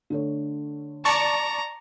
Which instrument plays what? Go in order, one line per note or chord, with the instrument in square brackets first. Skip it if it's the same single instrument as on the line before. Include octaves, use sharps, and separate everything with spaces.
[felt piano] D3 A3 C#5
[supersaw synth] D5 A5 C#6 [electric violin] A#5